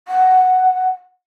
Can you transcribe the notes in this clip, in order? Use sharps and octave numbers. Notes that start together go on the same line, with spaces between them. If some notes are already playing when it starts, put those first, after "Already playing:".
F#5